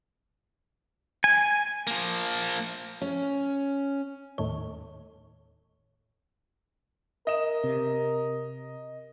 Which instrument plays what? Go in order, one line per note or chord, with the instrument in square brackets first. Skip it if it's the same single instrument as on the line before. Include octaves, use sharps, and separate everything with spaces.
[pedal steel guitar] G#5
[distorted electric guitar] F3 A#3
[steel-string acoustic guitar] C#4
[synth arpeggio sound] D#2 A2 D#3 C#5
[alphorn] A#4 [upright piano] D#5 E7
[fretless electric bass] C3